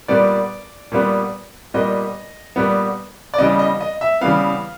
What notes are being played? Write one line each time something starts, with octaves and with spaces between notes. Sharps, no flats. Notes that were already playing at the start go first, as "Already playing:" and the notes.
A#2 G3 B3 D5
A#2 G3 B3
A#2 G3 B3 D#5
A#2 G3 B3
D5
C#3 E3 G3 B3 D#5
D#5
D#5
E5
C#3 E3 G3 B3 F5